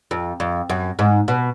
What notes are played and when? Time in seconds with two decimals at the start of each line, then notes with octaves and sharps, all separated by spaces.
0.11 F2
0.40 F2
0.70 F#2
0.99 G#2
1.28 B2